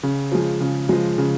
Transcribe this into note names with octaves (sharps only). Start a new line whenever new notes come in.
C#3
F3 G#3
C#3
F3 G#3
C#3